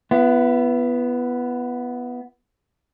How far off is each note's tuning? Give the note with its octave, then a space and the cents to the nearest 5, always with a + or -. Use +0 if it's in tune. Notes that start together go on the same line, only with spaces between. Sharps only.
B3 +0 E4 +40